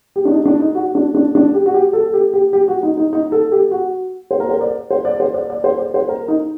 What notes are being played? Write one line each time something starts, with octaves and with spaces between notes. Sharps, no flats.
G4
D4
D#4
D4
D#4
F#4
D4
D4
D4
G4
F#4
G4
A4
G4
G4
G4
F#4
D#4
D#4
D#4
A4
G4
F#4
C5
A#4
C5
D5
C5
D5
C5
D5
D5
C5
D5
C5
A#4
D#4